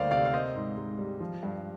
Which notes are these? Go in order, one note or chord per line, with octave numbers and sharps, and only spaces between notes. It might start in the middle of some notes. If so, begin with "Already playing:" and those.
Already playing: D2 G3 A#3 C5 D5 D#5 F5
C3 D5 F5
F5
A#3 C5 D#5
G#2
G#2
G3
F3
G2